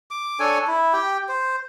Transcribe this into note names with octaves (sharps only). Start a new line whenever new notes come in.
D6
D4 A4 C#5 G#5
E4
G4 G5
C5